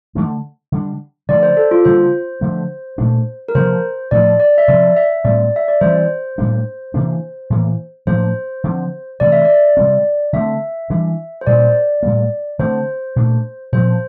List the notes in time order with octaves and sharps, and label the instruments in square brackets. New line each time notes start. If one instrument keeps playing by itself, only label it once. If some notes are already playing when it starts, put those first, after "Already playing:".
[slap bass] D3 F3 A3 D4
D3 G3 D4
[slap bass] D3 F3 A3 D4 [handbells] D5
[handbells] C5
A4
F4
[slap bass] D3 G3 A#3 [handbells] C5
[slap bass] D3 F3 A3
A#2 A3 D4
[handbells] A#4
[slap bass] C3 F3 A#3 [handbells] C5
[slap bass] A2 F3 A3 D4 [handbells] D5
[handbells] D5
E5
[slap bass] C3 F3 C4 [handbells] D5
[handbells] E5
[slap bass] A2 G3 C4 [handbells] D5
[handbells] E5
D5
[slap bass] E3 G3 C4 [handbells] C5
[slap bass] A2 G3 A#3 D4
C3 E3 A#3 D4
A2 E3 A#3
[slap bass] A2 F3 A#3 D4 [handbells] C5
[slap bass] D3 F3 C4
[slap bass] C3 E3 A3 [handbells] D5
[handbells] E5
D5
[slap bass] C3 G3 C4
[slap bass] D3 A3 C4 [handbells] E5
[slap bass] E3 G3 D4
[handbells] C5
[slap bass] A#2 G3 A#3 D4 [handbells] D5
[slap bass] A2 G3 A#3
[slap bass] D3 A3 C4 [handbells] C5
[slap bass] A#2 A3 D4
[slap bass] A#2 F3 C4 [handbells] C5